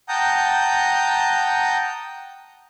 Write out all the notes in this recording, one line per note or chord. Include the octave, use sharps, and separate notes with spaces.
F#5 G5 A5 A#5 D#6 G6